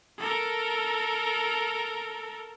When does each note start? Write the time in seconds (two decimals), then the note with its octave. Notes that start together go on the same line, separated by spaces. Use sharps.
0.18 A4 A#4